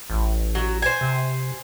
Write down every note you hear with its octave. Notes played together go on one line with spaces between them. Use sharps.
A1
F#3
C5 G#5
C3